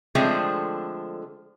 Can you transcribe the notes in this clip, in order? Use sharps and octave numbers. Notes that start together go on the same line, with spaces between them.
D3 F3 G#3 A3 C4 D4